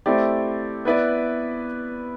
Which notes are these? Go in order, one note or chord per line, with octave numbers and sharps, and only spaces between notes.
A3 C4 E4 G4 D5
B3 E4 B4 D5